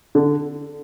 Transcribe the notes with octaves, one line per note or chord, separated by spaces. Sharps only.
D3